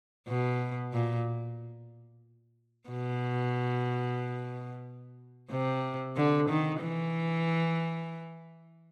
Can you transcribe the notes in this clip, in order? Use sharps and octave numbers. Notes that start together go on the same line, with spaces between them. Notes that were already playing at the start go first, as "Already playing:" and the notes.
B2
A#2
B2
C3
D3
D#3
E3